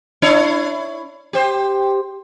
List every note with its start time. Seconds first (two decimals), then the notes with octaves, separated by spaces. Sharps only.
0.22 D4 E4 C#5
1.33 G4 C5